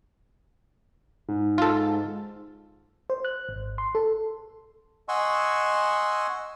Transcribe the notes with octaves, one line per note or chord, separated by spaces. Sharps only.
G#2
F4 A4
C5
F#6
G#1
C6
A4
D#5 F#5 G#5 C6 C#6 E6